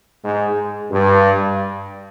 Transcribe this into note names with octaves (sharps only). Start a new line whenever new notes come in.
G#2
G2